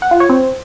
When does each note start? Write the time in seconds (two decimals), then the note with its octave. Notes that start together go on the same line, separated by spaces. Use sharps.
0.02 F#5
0.11 F4
0.20 C#5
0.29 C4